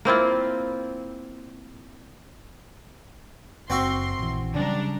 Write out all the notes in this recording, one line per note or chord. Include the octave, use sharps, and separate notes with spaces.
A#3 C4 E4 F4
F#1 C4 F#4 E5 C6
A#1 E3
C#3 F#3 G3 C#4 D4 A#5